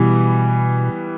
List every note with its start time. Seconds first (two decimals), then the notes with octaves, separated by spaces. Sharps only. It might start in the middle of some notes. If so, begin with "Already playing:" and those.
Already playing: B2 E3 G3 B3